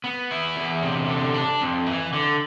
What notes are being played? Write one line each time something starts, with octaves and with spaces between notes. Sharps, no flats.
B3
E4
E2
C3
D3
D4
F2
E3
D3